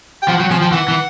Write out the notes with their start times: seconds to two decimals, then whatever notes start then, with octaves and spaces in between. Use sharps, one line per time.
0.23 G5
0.28 F3 F#5
0.39 F#3 G5
0.50 F3 G#5
0.61 F3 G5
0.72 E3 F#5
0.88 E3